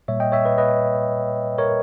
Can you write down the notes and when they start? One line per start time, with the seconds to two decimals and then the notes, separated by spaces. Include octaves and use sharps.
0.08 A#2 G3 A#3 C#5 E5
0.20 D#5 G5
0.32 C#5 E5
0.45 B4 D#5
0.58 B4 D#5
1.58 A#4 C#5